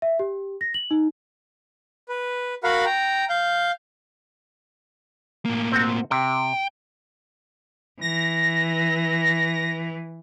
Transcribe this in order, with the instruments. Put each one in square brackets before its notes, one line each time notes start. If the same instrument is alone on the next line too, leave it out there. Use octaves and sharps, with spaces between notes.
[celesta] E5
G4
A#6
F#7
D#4
[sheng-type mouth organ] B4
F#4 A#4 F5 F#5 B5
G5 A#5
F5 G6
[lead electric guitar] A2 A#3
[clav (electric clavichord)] C4 F#4
[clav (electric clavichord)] C3 [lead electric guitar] G5
[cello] E3 [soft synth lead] A#6